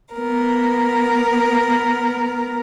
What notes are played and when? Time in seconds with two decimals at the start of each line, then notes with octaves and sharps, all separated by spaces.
0.13 B3 A#4